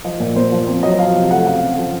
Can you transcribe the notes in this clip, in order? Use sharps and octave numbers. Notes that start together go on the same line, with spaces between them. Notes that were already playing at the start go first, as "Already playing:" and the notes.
F3 D#5
A#2
A#3 C5
F3
C4
F#3 D#5
F3 F5
C3
A3 F#5
C#3 F5
C4
F3